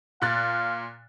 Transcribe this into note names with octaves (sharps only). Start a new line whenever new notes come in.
A#2 F5 F#6 A6